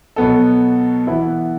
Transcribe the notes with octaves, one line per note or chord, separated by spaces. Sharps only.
B2 F#3 B3 A4
E3 B3 E4